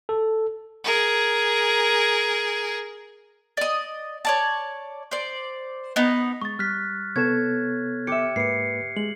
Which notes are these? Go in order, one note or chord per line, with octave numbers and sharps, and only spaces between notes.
A4
G#4 A#4
D5 D#5
C#5 D5 A5
C5 D5
B3 D#4
G#3 C#6 A6
G3 F6 F#6 B6
C3 B3 A4 C#5 G#6 E7
G4 E5 C#7
G#2 A#3 B4 C7 C#7
G#3 F#7